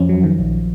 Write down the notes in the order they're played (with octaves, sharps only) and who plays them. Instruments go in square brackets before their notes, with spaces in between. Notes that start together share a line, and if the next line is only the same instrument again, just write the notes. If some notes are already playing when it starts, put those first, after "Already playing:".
Already playing: [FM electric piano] F2 C#4 [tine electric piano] F3
[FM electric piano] F#3
D#3
A#1